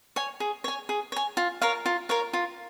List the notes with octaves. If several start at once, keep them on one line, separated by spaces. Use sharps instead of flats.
C#5 G#5
G#4
C#5 G#5
G#4
C#5 G#5
F4
A#4 C#5 F5
F4
A#4 C#5 F5
F4